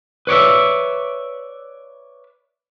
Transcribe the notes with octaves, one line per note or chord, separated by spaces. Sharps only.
B4 C#5 D5 E5